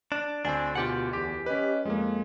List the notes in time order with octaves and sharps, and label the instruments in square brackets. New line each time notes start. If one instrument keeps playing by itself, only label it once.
[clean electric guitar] D4
[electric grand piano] D2 G#5 [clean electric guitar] C4 D4
[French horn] B2 [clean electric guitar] F4 G4 F#5
[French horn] E2 [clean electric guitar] G4
[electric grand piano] C#4 B4 [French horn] D#5
[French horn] F2 [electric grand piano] G#3 A#3